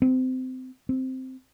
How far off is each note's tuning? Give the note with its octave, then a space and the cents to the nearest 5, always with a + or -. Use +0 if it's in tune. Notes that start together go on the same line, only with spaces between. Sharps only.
C4 -25
C4 -5